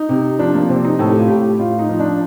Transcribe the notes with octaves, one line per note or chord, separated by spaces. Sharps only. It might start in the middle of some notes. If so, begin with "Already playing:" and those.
Already playing: D#4
C3
F3 D4
A#3
C3 C4
D#4
A2 A4
G4
F4
A2 G4
A2 F4
D#4
F3
D4